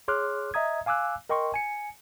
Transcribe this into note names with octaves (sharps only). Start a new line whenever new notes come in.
G#4 C#5 C6 D6 F6 F#6
D#5 E5 A#5 D#6 G#6
F5 G#5 D6 E6 F#6
A#4 D#5 G5 C6 C#6
G#5 C#7